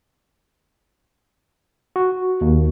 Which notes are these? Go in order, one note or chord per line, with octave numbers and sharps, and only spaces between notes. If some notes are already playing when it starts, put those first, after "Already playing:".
F#4
D#2